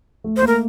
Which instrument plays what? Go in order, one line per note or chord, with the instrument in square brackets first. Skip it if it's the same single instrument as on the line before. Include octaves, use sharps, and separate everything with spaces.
[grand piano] A3
[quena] C5
[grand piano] A#3
[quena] A#4